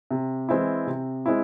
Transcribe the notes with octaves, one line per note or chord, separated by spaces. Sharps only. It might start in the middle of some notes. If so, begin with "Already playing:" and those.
C3
E3 G#3 C4 E4
C3
G#3 C4 E4